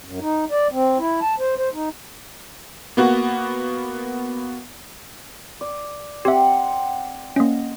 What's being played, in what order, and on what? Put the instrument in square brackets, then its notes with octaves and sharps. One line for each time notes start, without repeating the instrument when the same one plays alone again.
[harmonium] F#2
D#4
D5
C4
E4
A5
C5
C5
D#4
[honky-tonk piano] A#3 B3 F#4
[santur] D5
[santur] C4 F#5 [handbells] G4 E5
[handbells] A#3 C#4 [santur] D#5